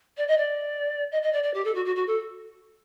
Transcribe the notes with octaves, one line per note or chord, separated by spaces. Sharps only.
D5
D#5
D5
D#5
D#5
D5
D5
G4
A4
F#4
F#4
F#4
A4